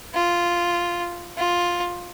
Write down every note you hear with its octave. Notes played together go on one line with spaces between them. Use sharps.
F4
F4